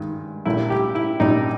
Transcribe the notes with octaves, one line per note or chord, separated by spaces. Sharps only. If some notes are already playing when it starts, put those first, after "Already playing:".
Already playing: G2 D#3 G#3
A#1 A#2 G3 E4
G4
E4
A#1 A#2 G3 D#4